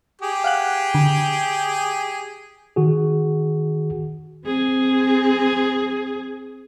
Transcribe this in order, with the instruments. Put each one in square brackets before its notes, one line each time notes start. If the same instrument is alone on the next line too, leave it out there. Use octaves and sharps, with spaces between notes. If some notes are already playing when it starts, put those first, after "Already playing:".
[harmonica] G4 G#4
[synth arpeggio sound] F5 F#5 F#6
D3
[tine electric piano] D#3 F#4 G#4
[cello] C4 G#4